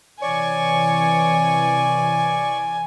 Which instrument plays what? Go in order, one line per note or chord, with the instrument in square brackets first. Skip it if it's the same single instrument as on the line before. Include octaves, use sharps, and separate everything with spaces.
[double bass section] C3 E3 [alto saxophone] C#5 [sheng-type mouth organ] D5 C#6 [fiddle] G#5